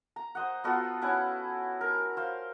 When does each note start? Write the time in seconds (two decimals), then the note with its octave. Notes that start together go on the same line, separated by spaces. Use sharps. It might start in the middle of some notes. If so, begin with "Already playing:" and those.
0.16 A#5
0.35 C5 D#5 F#5
0.64 B3 F4 F#4 A4
1.02 C#4 E4 B4 F#5
1.81 A#4
2.17 C5 F5